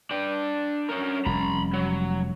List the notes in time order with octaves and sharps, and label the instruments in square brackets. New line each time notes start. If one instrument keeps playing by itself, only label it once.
[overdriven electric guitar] D4 G5
C#4 A#4
[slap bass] F1 G3 C#4 [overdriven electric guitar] A#5 B5
[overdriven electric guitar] F#3